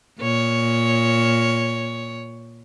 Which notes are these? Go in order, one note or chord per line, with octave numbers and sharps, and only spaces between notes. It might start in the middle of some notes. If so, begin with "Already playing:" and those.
A#2 C#5